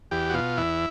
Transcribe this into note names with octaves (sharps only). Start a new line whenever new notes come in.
E2 G4
F#4
B2 F4
E2 E4